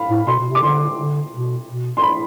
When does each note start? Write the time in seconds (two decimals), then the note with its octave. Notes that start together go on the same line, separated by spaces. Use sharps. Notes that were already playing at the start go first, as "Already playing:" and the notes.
Already playing: F5 B5
0.10 A2
0.27 B2 C6
0.39 B2
0.50 C3
0.55 D6
0.62 D3 C6
0.97 D3
1.32 B2
1.68 B2
1.97 C6
2.02 B5